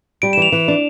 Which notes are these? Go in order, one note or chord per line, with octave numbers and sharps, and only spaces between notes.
G3 D7
E7
E3 F7
E3
D4